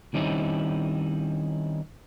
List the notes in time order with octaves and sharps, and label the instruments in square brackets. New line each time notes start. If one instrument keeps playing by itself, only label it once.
[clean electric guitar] D#3 G3 C4 C#4 D#4 E4